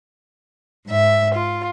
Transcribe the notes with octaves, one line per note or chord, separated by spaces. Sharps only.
G#2 E5
F4